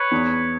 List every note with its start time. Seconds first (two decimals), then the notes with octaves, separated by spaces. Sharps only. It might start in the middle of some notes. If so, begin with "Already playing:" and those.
Already playing: B4 C#5
0.11 E2